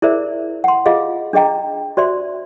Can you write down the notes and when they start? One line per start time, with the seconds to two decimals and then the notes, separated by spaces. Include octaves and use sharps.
0.02 E4 G#4 A#4 C5 D5 E5
0.64 F#5 C6
0.86 F4 G#4 D#5 F5
1.33 D4 G#4 D#5 G5 A#5
1.97 F#4 C5 D5 E5 C6